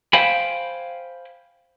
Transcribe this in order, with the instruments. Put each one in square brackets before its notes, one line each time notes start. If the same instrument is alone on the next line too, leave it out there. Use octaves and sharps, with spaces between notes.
[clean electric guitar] C5 F5 G5 G#5 B5